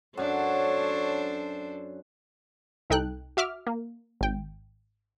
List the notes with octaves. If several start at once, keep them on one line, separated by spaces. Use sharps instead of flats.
F#2 D4 A4 C5 C#5
C2 D#4 A4 G5 F#6
F#4 E5 D6 F6
A#3
G#1 G5